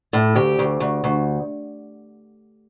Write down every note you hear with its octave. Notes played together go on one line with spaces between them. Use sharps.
A2
D2 G4
D2
D2
D2